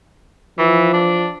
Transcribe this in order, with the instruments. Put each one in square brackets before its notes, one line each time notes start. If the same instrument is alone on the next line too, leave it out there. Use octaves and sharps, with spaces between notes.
[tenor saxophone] E3 [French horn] F3
[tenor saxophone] D4